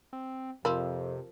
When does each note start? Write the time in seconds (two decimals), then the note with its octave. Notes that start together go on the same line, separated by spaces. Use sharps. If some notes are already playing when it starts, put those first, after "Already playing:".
0.13 C4
0.65 F2 C3 F3 A#4 B5